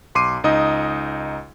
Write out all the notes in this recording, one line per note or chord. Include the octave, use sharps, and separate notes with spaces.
B1 C6 D6 C7 D#7
C#2 D#4 D#5 D#6